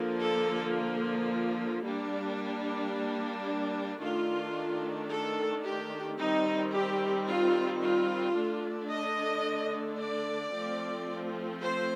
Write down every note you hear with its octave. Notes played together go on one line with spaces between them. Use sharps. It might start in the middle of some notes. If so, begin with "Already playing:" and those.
Already playing: D3 F3 A#3
A4
G3 A#3 D4
D#3 A3 D4 F4
A4
G4
D#3 G3 C4 D#4
G4
F4
F4
D3 A3 D4
D#5
D5
F3 A3 C4
C5